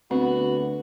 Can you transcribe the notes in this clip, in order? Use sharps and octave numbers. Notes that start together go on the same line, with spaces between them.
D2 B3 C4 F#4